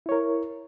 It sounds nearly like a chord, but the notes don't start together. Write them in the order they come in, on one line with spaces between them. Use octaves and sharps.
E4 C#5 A#4